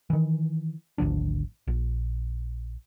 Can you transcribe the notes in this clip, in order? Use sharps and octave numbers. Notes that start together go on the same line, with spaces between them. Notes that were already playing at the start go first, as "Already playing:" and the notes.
D#3 E3
G#1 D2 F3 D4
A#1